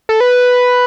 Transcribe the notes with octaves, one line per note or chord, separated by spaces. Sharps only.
A4
B4